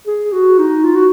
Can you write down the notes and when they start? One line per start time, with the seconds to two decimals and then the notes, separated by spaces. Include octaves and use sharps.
0.07 G#4
0.32 F#4
0.59 D#4
0.84 F4
0.95 F#4